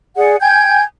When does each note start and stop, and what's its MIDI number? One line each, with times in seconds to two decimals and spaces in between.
0.17 0.37 68
0.17 0.37 74
0.17 0.37 78
0.41 0.83 79
0.41 0.83 80
0.41 0.83 91
0.41 0.83 92